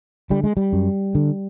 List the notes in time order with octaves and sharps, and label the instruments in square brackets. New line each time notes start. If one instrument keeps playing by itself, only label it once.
[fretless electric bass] D3 G3
G#3
G3
F#2
D3